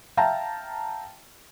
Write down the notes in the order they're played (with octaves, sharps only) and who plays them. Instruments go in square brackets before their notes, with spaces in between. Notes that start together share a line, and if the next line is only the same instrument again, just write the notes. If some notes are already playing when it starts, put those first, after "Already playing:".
[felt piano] E5 F5 G5 A5 A#5